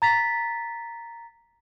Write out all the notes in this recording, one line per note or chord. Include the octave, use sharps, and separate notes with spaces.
A#5 A6 B6